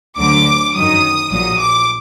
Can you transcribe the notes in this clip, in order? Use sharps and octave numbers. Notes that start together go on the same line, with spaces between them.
D2 D3 F#3 D6
F#2 D#3 F#3 D#6
A#1 A#2 F#3 D#6
D6